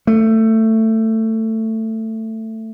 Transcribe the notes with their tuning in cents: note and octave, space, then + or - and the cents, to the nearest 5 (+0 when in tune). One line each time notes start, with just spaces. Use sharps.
A3 +15